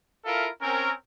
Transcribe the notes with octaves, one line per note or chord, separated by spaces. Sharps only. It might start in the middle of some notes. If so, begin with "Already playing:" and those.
E4 F4 A4 A#4 E5 F5
C4 C#4 A#4